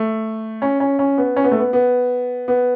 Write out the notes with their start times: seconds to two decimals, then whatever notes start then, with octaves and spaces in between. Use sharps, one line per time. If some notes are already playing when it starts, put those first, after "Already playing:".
Already playing: A3
0.62 C#4
0.80 C#4
0.99 C#4
1.18 B3
1.36 C#4
1.44 B3
1.52 A3
1.59 B3
1.73 B3
2.48 B3